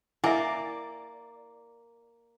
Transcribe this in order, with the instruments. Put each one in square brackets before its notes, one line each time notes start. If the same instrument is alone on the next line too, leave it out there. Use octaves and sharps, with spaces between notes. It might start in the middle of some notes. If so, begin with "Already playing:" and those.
[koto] A#3 D5 [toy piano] E4 A#4 E5 [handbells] F#5 G#5